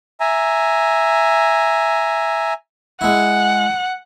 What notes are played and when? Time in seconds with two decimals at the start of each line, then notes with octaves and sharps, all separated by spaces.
0.20 E5 G#5 A#5
3.01 G#3 E4 F#5